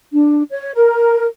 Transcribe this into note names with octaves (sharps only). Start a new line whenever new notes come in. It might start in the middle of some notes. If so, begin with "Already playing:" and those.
D4
C#5
A#4